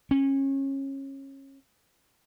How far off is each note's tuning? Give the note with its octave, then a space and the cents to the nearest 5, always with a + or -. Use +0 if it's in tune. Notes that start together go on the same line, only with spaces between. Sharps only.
C#4 -25